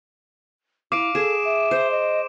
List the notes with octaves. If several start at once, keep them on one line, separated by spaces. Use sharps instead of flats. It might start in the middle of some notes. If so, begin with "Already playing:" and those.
E4 F5 D6 D7
G#4 A4 E7
E5
C5
D#5